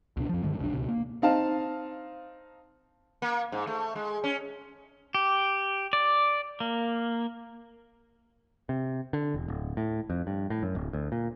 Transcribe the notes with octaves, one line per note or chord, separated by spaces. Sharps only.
C#2 B2 D4
F2 F3
G2 D3 D#3 G#3
F1 B1 D4
C#2 B2
A#3
C4 D#4 F5 A5
A#3
G#2
A3
G#3
C#4
G4
D5
A#3
C3
D3
E1
D1
A2
F2
G2
A2
F#2
D1
D2
A#2